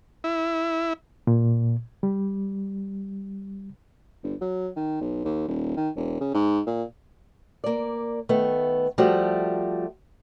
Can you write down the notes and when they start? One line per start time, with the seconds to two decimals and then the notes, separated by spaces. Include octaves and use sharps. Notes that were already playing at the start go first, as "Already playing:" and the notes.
0.24 E4
1.27 A#2
2.03 G3
4.23 G1
4.41 F#3
4.76 D#3
5.01 B1
5.25 D#2
5.48 D#1
5.77 D#3
5.96 E1
6.21 C#3
6.34 G#2
6.67 A#2
7.64 A#3 D5
8.29 D#3 A3 B3
8.98 F3 G3 A3 F#4 G4